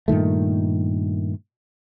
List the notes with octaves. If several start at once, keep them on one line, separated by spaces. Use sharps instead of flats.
G2 A#2 D#3 A3